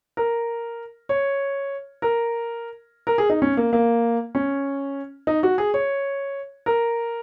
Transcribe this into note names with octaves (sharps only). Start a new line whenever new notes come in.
A#4
C#5
A#4
A#4
G#4
D#4
C#4
A#3
A#3
C#4
D#4
F#4
G#4
C#5
A#4